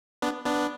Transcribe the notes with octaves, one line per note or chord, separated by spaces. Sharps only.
B3 D4
B3 D4